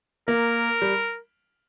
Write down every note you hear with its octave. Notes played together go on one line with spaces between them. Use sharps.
A#3 A#4
G3